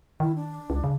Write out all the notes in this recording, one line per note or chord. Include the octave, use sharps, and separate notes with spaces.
D#3 E4
D4
C#2
C#3